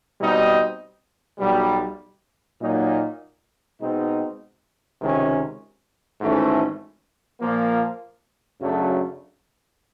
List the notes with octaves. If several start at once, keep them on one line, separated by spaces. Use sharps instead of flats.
B2 G3 C4 D#4
B1 B2 G3
A#2 F#3 A#3 D#4
B2 G#3 C4 D#4
C#2 C3 D#3 G#3 C#4
G#1 G#2 E3 A3 C#4
A#2 F3 A#3
F#2 C#3 F#3 A3 D4